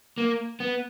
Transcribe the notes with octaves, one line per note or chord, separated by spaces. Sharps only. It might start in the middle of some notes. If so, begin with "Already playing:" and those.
A#3
B3